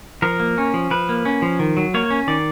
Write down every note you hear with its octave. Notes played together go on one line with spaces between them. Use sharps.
F3 A#4
A#3
C#4
F3
F3 B4
A#3
C#4
F3
D#3
F#3
A#3 C#5
C#4
D#3 D5